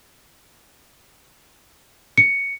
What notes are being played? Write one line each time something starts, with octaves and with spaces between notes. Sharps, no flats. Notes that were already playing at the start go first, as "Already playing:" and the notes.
C#7